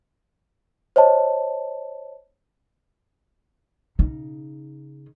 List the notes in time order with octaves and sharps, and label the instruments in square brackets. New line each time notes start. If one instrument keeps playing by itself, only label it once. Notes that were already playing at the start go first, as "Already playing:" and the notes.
[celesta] C5 C#5 D#5 A5
[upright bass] C#3 D#4